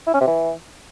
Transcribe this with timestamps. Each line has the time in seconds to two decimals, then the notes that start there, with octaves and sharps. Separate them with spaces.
0.07 E4
0.14 C#4
0.21 C3
0.27 E3